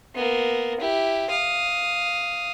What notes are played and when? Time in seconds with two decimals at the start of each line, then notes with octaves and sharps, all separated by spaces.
0.15 A#3 B3
0.80 E4 G4
1.30 F5 D#6